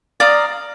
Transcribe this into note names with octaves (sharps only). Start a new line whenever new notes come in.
D5 F5 A#5 D#6